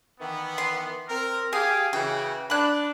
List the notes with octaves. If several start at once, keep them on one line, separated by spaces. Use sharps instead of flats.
D#3 E3 B3
C6
C4 A#4
G4 G#4 F5 G#5
C#3 E3 F#4 G5
D4 B5 F#6